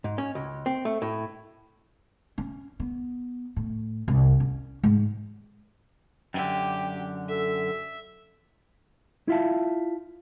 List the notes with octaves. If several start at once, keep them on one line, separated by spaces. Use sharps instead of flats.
G#2
C#4
C#2
C4
A3
A2
C#4
B3
A2
C2
C#4
G#2
F#2 D3 G4 G5
A4 E5
E4 F4 E5 F5 A5